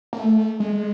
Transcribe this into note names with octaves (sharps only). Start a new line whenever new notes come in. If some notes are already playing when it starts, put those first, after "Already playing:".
A#3
A3
G#3